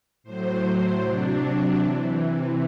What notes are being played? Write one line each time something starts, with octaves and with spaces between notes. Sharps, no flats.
A2 F#3 C5
C3 F#3 D4
C3 E3